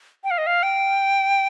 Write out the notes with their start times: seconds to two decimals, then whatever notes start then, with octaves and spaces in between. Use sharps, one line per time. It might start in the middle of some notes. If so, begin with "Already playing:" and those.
0.24 G5
0.31 F5
0.38 D#5
0.47 F5
0.63 G5